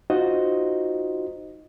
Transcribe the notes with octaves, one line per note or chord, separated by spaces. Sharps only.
D#4 F4 F#4 C5 D#5